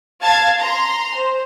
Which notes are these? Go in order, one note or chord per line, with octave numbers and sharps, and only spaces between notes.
F5 A5 G#6 C7
A#5 C6
C5